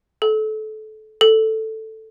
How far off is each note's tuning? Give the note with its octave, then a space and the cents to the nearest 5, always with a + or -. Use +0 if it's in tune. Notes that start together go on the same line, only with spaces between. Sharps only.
A4 -25
A4 +5